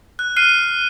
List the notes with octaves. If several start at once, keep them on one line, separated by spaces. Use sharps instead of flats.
F#6
F6 F#6 C7 D#7